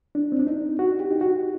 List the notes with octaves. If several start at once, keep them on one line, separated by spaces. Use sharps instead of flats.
D4
C4
D4
D#4
F#4
G4
D#4
F#4